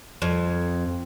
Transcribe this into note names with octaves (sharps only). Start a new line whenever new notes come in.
F2